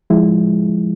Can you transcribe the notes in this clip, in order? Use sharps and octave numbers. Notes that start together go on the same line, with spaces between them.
F3 G#3 E4